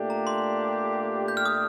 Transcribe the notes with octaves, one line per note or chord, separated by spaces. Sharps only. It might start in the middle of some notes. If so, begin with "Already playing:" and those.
Already playing: A#2 A3 D4 G4
A#5
C6
G6
F6
D#6